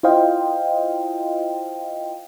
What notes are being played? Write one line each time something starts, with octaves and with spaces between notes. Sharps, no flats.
E4 F4 C5 D#5 F5 G5